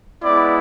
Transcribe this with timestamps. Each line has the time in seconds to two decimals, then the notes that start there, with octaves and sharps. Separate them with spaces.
0.23 G#3 B3 E4 D5